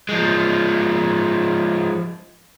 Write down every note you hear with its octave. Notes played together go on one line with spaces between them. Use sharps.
F3 G#3